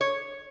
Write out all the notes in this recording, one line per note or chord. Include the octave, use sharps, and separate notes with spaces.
C#5